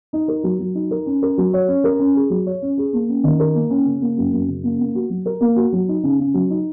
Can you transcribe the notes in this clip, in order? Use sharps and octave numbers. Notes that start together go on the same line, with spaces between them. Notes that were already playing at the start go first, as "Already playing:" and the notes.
D#4
A#4
F#3
F#3
D#4
A#4
C#4
A#4
F#3
C#5
C#4
A#4
C#4
G#4
F#3
C#5
C#4
G#4
A#3
C#4
D#3
A#4
A#3
C#4
C#3
A#3
F#2
F#2
C#3
A#3
A#3
F#4
F#3
A#4
A#3
F#4
F#3
D#4
C#3
C#3
F#3
D#4